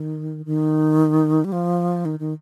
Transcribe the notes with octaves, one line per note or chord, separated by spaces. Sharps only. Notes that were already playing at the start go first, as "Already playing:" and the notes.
Already playing: D#3
D#3
G3
F3
D#3
D#3